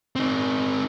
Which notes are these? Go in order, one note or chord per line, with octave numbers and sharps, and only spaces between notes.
C4 D#4